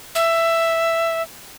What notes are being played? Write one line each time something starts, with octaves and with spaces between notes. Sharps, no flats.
E5